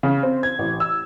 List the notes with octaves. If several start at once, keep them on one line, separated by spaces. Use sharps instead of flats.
C#3
C4
G#6
A1
E6